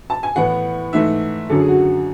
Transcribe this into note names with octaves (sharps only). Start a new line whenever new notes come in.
A5
G#5
A2 E3 B3 F#5
G#2 E3 A3 E5
F#2 D3 F#3 A4
G#4
F#4